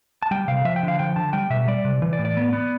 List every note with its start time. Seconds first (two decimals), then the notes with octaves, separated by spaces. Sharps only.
0.22 A5
0.31 G3 G5
0.48 C3 F5
0.65 F3 E5
0.76 G5
0.83 D3
0.88 F5
0.99 F3 G5
1.16 D3 A5
1.33 G3 G5
1.50 B2 E5
1.68 G3 D5
1.85 C3
2.02 E3
2.13 D5
2.19 A2
2.25 D5
2.37 B3
2.53 B3